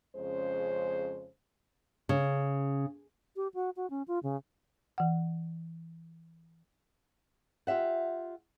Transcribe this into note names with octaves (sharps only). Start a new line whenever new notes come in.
F2 C#3 G#3 C#4 C5
C#3
G4
F#4
F#4
C#4
F4
C#3
E3 F#5
F4 G4 E5 F#5